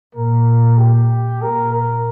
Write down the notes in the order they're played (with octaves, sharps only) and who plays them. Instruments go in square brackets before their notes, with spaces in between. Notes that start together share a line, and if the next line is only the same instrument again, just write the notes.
[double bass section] A#2 [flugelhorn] A#4
[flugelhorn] G4
[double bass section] A#2 [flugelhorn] A#4
[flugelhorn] A#4